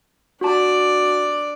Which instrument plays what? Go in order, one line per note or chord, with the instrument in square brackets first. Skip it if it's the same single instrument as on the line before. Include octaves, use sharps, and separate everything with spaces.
[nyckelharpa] D4 D5 [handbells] F#4 A5